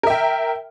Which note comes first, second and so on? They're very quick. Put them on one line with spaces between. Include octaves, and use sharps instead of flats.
A#4 E5 G5